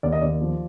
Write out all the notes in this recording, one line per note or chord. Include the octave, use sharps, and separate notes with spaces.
D#2 D5
D#5
D#2 D5
F3